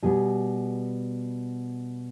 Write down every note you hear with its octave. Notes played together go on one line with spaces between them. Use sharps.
B2 G3 B3 G#4